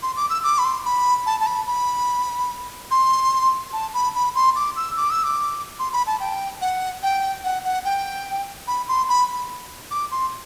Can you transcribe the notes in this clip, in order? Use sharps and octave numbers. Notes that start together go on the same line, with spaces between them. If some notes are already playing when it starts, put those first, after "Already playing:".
C6
D6
E6
D6
B5
C6
B5
A5
A5
B5
B5
C6
A5
B5
B5
C6
D6
E6
D6
E6
D6
C6
B5
A5
G5
F#5
G5
F#5
F#5
G5
B5
C6
B5
D6
C6